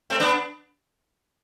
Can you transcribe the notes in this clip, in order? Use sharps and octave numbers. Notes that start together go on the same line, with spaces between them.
A3 C4
B3 D4